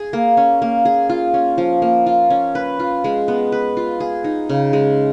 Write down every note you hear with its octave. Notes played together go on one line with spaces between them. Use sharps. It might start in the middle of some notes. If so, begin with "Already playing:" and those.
Already playing: G#4
A#3
C#4
A#3
G#4
F4
C#4
F3
A#3
F4
C#4
B4
F4
G#3
B3
B4
F4
G#4
D#4
C#3
G#3